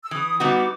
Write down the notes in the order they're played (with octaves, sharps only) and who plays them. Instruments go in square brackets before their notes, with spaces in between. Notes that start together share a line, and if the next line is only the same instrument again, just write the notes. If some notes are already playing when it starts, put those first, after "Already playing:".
[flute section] E6
[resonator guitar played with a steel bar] E3 [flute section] D#6
[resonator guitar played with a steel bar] G3 B3 D#4 F#4 [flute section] D6